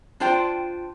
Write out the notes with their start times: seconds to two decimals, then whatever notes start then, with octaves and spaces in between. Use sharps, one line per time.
0.20 D4 F4 C5 G5